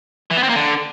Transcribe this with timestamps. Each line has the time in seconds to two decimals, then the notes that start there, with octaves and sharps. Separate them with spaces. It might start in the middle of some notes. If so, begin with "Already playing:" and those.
0.31 E3
0.37 B3
0.43 C4
0.49 A#3
0.56 D3